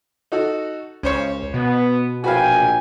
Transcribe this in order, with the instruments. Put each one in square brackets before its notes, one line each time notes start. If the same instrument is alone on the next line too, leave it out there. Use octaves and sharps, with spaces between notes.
[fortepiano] D#4 F#4 A4
[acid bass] C#2 [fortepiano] C#4 C5 C#5
[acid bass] B2 [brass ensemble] B3
[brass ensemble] A#1 G5 G#5 [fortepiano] F#4 B4 F5